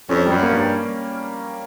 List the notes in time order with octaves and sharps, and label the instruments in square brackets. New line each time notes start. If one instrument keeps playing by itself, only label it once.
[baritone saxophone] F2 [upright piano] C#4
[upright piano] G3
[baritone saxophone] F#2
[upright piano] A#3
[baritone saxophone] G2
[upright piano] G3